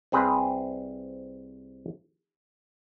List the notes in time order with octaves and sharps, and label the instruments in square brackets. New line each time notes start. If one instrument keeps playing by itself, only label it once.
[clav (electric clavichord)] C2 C4 G#4 B4